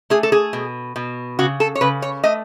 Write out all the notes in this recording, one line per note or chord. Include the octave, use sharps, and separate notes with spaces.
A3 G#4
A4
G#4
B2
B2
C#3 F#4
A4
C#5
C#3 B4
C#5
A3 D#5